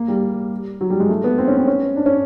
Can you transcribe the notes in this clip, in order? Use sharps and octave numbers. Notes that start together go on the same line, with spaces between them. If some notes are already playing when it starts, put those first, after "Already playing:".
Already playing: A#3
G3
F#3
G3
G#3
A3
B3
C4
C#4
C4
C#4
D4
C#4